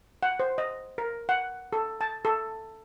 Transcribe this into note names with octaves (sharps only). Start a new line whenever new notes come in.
F#5
C5
D#5
A#4
F#5
A4
A5
A4